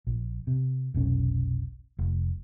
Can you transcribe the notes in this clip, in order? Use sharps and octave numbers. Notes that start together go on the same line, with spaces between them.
A#1
C3
F1 B1 C#4
F1